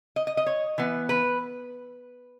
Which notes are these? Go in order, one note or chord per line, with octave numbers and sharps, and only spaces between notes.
D#5
D#5
D#5
C#5
E3 B3
B4